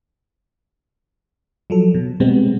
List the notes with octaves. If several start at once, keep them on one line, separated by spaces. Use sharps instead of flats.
F3 F#3 A4
B2
B2 G3 G#3 B3 C4